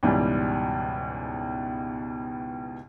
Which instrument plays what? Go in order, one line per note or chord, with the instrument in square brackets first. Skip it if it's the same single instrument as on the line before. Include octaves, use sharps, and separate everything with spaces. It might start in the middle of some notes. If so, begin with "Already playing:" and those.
[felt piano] C#2 G#2 B2 E3 G3